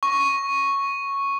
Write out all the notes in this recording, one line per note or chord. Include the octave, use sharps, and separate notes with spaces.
C#6